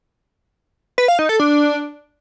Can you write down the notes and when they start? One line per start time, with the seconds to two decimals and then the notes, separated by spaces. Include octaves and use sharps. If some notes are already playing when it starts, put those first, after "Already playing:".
0.98 B4
1.08 F5
1.19 D#4
1.29 A4
1.40 D4